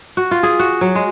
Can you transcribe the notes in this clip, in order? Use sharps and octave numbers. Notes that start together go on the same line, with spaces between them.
F#4
F4
G#4
F#4
F#3
G#3